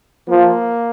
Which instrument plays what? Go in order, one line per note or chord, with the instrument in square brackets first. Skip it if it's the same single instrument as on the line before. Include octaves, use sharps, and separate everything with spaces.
[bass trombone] F3 [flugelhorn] A#3